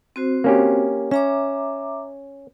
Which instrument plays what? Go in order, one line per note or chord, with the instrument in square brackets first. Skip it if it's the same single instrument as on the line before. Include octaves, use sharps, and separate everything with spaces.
[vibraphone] C4 F#4 C5
[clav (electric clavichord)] A#3 C#4 G4
[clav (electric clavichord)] C#4 [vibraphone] E5 A#5 D6